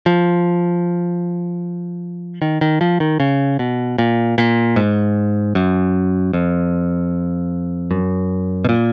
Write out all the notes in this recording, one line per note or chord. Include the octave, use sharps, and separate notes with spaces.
F3
D#3
D#3
F3
D#3
C#3
B2
A#2
A#2
G#2
F#2
F2
F#2
B2
A#2